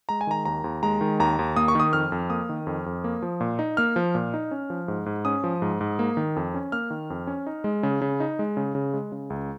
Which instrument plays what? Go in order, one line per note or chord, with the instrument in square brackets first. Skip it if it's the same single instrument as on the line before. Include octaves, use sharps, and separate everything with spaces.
[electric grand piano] G#3 A#5
G#5
D#3 A#5
D#2 A#5
D#2
G#3 A#5
D#3
D#2 A#5
D#2
A#3 D#6
C#6
D#3 D#6
F2 F6
F2
A#3 D#6
D#3
F2
F2
A#3
F3
A#2
D#4
A#3 F6
F3
A#2
D#4
C#4
F3
G#2
G#2
C#4 D#6
F3
G#2
G#2
A#3
D#3
F2
C#4
A#3 F6
D#3
F2
C#4
D#4
G#3
C#3
C#3
D#4
G#3
C#3
C#3
G#3
C#3
C#2